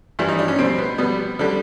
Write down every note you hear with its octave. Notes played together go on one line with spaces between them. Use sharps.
G2 E3 G3 E4
D#4
D4
C#4
B2 G3 C4
B3
B2 G3 B3
D3 G3